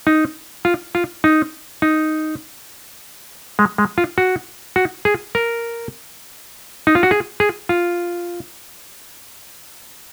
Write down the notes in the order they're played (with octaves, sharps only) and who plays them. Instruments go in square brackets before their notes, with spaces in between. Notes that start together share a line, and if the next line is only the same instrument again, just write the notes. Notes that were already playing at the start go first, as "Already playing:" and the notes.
[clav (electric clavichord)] D#4
F4
F4
D#4
D#4
G#3
G#3
F4
F#4
F#4
G#4
A#4
D#4
F4
F#4
G#4
G#4
F4